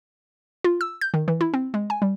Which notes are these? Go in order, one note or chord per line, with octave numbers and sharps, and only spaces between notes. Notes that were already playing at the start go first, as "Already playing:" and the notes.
F4
E6
G6
D#3
E3
E4
C4
G#3
G#5
G3